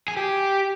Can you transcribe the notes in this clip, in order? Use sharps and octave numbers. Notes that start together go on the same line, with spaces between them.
G#4
G4